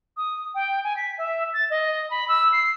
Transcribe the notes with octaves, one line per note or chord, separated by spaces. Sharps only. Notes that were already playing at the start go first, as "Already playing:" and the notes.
D#6
G5
G#5
B6
E5
A6
D#5
B5
E6
C7